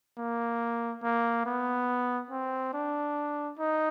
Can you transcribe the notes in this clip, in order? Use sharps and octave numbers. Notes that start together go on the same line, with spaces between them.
A#3
A#3
B3
C4
D4
D#4